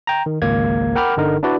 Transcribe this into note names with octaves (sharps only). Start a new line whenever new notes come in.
G5 A#5
D#3
G#1 C#2 A#3 G#6
A#4 F#5 G5 B5 D6 F6
G1 D3 D#4 A#4
D4 E4 F#4 B4 D5